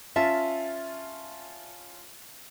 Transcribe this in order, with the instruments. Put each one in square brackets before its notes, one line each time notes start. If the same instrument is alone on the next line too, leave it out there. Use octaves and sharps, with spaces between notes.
[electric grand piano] C#4 F4 A5 [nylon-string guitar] E5